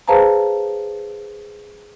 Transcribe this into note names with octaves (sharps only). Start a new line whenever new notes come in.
G#4 B4 C5 F5 A5 A#5